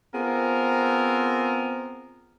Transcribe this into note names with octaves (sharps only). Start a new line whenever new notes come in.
B3 C4 F4 G#4 A#4